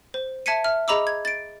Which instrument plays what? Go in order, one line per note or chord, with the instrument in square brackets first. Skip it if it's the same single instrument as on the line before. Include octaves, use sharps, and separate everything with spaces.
[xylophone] C5
E5 A5 G#6 B6 C#7 D#7
E5 F6
G#4 D#5 A#5 B5 D6 E6
G#6
A6 D7